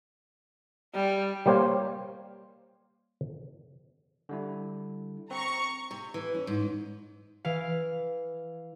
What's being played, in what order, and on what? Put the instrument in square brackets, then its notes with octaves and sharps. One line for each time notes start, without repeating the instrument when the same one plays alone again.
[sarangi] G3
[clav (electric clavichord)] G3 A#3 G4 C5 C#5 F5
[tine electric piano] D3 G3 E4
[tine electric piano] C4 [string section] A#5 C#6
[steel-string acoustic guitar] C3
E3
C#4
G#2
[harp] E3 F5